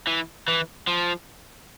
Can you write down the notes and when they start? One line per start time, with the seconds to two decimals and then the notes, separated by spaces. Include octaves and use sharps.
0.07 E3
0.48 E3
0.88 F3